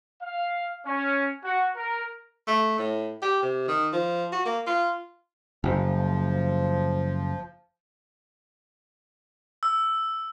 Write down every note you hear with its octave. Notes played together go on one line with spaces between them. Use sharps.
F5
C#4
F#4
A#4
A3
A2
G4
C3
D#3
F3
F#4
A#3
F4
F#1 F3
E6